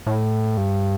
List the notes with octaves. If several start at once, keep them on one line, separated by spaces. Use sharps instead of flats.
A2
G2